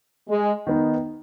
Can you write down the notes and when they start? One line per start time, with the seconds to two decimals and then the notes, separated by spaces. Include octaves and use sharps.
0.29 G#3
0.67 D#3 B3 D#4